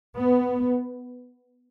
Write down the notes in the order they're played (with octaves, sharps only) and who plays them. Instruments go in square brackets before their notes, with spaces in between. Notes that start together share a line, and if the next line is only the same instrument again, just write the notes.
[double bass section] B3